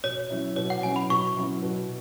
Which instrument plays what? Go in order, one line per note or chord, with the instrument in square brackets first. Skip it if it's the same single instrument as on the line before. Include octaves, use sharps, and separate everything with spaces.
[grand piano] B2 [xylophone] C#5
[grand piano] F#3 C#4 E4
[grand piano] B2 [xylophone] C#5
[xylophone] F#5
[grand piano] F#3 C#4 E4 [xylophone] G#5
[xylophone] B5
[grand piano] B2 [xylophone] C#6
[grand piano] F#3 C#4 E4
B2